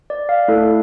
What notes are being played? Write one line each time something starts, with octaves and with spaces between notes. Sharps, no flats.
D5
F5
A3 E4 A4